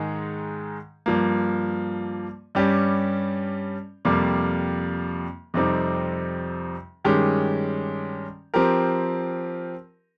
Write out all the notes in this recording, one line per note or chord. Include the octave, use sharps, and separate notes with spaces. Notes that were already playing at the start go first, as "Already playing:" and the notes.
Already playing: G#2 D#3 G#3 D#4 G#4
G2 F3 A#3
G2 G3 C#4 G4
F2 C3 G3 A#3
F2 C3 G3 C4 D#4
G2 D#3 G#3 C#4 G4
F3 C4 G4 A#4